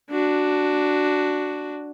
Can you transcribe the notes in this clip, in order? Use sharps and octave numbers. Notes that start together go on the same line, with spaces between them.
D4 F#4